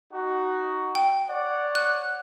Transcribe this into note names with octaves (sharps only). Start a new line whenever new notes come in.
D#4 F#4
G5
C#5 D5 F#5
F#6